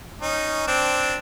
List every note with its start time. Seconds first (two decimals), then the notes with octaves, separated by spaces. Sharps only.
0.22 C#4 D#4
0.67 C4 D4